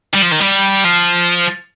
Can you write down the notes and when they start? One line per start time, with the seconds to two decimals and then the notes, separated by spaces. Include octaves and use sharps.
0.14 G3
0.23 F3
0.32 D#3
0.40 G3
0.85 F3